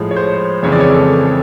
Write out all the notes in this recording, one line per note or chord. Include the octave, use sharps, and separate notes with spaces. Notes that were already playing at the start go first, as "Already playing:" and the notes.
Already playing: A2 F3 G#3
C#5
C5
F2 C#3 E3 G#3 C4 C#5
D5
C#5
A4
A4